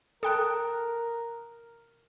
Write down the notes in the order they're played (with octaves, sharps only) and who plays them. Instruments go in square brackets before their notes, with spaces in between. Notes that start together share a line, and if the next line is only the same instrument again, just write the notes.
[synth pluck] A4 G5 A5 [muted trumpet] A#4 [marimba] D#6 F#6